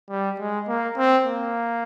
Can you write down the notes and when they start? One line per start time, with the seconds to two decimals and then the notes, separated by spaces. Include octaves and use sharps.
0.10 G3
0.39 G#3
0.68 A#3
0.97 C4
1.26 A#3